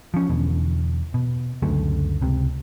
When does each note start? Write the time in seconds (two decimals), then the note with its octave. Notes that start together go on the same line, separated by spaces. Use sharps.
0.14 F3 C#4
0.30 E2 B2 D3
1.14 B2
1.62 C#2 F#2 D3 A3
2.21 C#2 C3